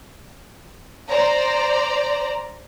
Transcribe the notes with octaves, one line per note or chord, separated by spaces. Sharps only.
C5 D5 A#5